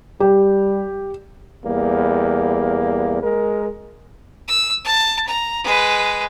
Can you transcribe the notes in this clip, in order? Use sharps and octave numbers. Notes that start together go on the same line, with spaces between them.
G3 G4
E2 G3 A#3
G#3 A#4
E6
A5
A#5
G#3 B4